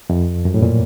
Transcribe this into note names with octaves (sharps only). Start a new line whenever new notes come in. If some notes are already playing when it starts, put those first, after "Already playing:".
F2
F#2
A2
A#2